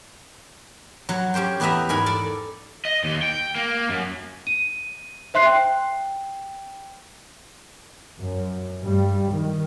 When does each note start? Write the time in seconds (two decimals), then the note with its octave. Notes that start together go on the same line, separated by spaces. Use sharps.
1.09 F#3 F#4 C#5
1.34 C#4 G4 C5 G5
1.60 E2 B3 G4 B4 E5 A#5
1.89 G#2 A#4 G#5 B5
2.06 A4 D5
2.85 D#5
3.04 D#2
3.22 G5
3.55 A#3
3.89 F#2
4.47 D#7
5.34 C5 E5 C6 F#6 C7
5.46 G5
8.18 F#2
8.81 G2 G3
9.33 D#3